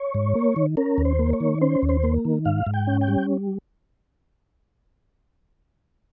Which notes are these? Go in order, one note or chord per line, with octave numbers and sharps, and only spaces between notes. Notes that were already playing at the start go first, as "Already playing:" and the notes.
Already playing: C#5
G#2
A#3
D#3
C#4 A#4
D#2
C5
A#3
C#5
D#3
C#4 C5
D#2
C5
A#3
D#3
G#2 F5
G#2
G5
C#4
G5
G3